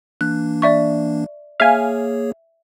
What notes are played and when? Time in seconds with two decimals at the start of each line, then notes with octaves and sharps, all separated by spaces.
0.21 E3 A#3 D4 F#6
0.62 D5 E5 C#6
1.60 A#3 G#4 C#5 E5 F5 G#5